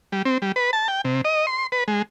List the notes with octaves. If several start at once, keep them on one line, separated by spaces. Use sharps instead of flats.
G3
C4
G3
B4
A5
G5
C3
D#5
C6
B4
G#3